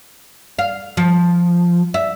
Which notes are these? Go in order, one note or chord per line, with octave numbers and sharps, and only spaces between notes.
F5
F3
E5